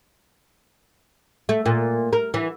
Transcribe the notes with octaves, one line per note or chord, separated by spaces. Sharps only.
A3
A#2
A#4
E3